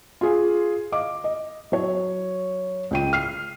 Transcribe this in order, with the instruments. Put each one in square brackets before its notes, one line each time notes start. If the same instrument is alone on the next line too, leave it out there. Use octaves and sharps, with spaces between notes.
[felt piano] F4 G#4
D#5 F5 D6
D#5
F#3 C#5
C#2 G5 D#7
F6 C7